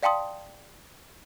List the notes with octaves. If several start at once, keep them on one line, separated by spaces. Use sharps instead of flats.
D5 F5 G5 A5 C6 D#6